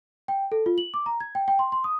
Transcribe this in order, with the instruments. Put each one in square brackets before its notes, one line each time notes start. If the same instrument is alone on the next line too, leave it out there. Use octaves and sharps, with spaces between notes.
[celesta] G5
A4
F4
F#7
D6
A#5
G#6
G5
G5
C6
C6
D#6